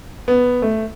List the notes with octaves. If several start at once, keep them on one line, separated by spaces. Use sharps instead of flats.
B3
A3